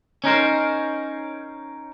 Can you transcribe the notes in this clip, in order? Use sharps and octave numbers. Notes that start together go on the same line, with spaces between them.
C#4 D#4 A#4 C5